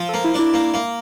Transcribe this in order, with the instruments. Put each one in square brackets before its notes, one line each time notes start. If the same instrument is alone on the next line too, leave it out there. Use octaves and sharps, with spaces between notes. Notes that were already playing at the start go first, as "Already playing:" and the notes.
Already playing: [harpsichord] F3
[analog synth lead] A4
[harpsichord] A#3
[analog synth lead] E4
[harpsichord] D4 [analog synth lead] E4
[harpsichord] A#3
A#3